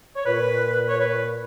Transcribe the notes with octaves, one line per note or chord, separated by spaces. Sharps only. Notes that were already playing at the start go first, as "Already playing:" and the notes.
C#5
A#2 B4
C#5
B4